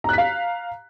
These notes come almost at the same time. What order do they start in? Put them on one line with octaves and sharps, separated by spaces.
A#5 F#6 B6 F5